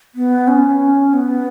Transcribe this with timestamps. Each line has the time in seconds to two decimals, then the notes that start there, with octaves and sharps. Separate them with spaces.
0.15 B3
0.48 C#4
1.13 B3